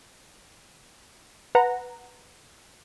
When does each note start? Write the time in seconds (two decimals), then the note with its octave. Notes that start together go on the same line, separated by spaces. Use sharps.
1.55 B4 F#5 A#5